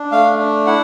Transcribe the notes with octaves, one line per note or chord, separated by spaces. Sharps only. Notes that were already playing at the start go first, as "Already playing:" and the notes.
Already playing: D4
A3 F5
D4
E4 F#5